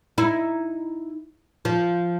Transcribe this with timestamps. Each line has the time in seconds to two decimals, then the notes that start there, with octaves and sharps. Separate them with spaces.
0.18 D#4 E4
1.65 F3